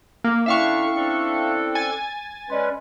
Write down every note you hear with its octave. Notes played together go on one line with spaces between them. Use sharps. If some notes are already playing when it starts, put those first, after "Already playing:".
A#3 D6
D3 C#4 D4 E4 E5 F5 G5 C#6
C4 D4 A4
G#5 A6
G#3 C#4 B4 D5 D#5 C6